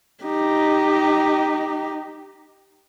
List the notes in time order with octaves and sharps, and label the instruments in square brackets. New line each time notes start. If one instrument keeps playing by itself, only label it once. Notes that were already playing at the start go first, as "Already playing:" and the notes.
[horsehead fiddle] D#4 G4